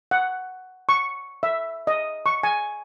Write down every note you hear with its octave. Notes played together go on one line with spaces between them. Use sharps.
F#5
C#6
E5
D#5
C#6
G#5